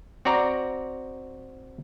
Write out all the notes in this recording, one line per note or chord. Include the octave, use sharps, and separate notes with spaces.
C4 F#4 D5 A#5